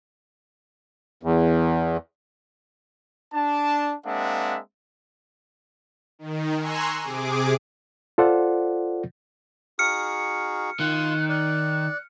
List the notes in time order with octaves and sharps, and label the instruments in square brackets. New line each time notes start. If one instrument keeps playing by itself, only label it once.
[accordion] E2
[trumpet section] D4 A5
G#3 A#3 C4 D4 E5 F#5
[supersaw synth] D#3
G#5 A#5 C6 C#6 E6 F#6
C3 G#4 D6
[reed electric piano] F4 A4 C5 D5 F#5
[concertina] D#4 F#4 G#4 [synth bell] F6 C#7
[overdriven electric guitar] D#3 [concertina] F4 C6 [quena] F#6
[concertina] D5 [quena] F#6